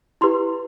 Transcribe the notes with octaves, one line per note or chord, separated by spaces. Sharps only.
E4 G4 B4 C6